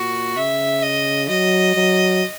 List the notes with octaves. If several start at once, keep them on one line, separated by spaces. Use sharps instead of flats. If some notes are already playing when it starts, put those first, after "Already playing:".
Already playing: A#2 F#4
C#3 E5
D#5
F#3 D#5
F#3